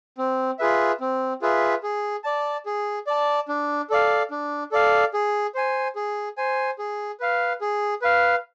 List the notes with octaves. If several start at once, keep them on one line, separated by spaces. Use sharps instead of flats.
C4
F4 G#4 B4 E5
C4
F4 G#4 B4 E5
G#4
D5 A5
G#4
D5 A5
D4
A4 D5 F5
D4
A4 D5 F5
G#4
C5 G#5
G#4
C5 G#5
G#4
B4 F5
G#4
B4 F5